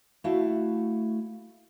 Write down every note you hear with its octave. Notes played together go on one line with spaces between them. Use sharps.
A3 E4 F#4 F5